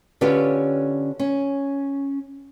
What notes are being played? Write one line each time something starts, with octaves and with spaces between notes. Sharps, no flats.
D3 C#4 F4 G4 B4 C#5
C#4